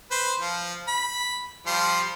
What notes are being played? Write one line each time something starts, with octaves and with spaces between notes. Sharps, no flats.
B4 C5
F3
B5
F3 G3 C6